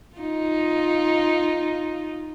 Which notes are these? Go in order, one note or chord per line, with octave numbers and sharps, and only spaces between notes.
D#4 F4